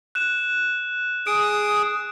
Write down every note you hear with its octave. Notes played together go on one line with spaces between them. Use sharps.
F#6 E7
G#4 D#6 D7